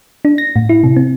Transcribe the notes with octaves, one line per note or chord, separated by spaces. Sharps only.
D4
A#6
A2
E4
C3
C4